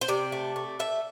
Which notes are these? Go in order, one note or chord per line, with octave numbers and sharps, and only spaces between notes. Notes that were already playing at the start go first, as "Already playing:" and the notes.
C5
C3 D5
A3
A3
A3 E5